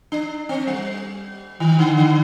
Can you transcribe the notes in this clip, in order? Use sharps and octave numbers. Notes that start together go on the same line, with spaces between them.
D4
C4
G3
D#3
D3
D3